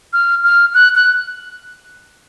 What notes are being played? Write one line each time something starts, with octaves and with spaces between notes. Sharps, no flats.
F6
F6
F#6
F#6